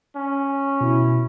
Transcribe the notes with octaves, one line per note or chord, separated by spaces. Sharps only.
C#4
B2 E4